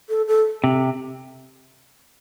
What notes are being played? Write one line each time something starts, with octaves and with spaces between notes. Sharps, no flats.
A4
A4
C3